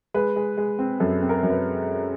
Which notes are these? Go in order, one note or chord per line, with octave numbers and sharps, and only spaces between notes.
G#3 B4
G#3
G#3
C4
F#2 A4
C4
A#4
F#2
B4